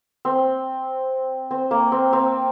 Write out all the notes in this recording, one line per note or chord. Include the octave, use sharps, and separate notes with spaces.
C4
C4
A#3
C4
C4